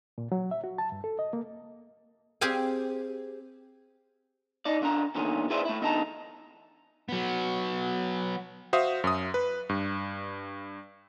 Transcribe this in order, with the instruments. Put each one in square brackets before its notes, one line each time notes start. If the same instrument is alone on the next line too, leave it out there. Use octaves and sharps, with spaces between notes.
[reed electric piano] A#2
F#3
E5
F#4
A5
G2
A4
D#5
A#3
[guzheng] C4 G4 G#4 C5 F5 G#5
[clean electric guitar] D#4 D5
C#3 D4 A#5
E2 A#2 D3 D#3 C#4
E4 G#4 B4 C5 D5 E5
A3 E4
E2 D3 D#4 F4 A5 A#5
[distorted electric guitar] F#3 B3
[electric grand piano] F#4 C5 E5 F5 D#6
F#2 D#6
B4
G2